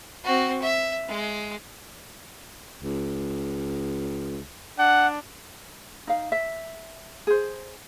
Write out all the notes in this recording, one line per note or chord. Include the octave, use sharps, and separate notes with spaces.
C4 F#4
E5
G#3
C#2
D4 F#5
D#4 F5
E5
G#4 C5